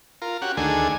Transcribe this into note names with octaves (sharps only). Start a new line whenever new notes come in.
F4 A#4
C#4 F#4 G4 F#5
D2 D#3 A3 D4 G#4 G#5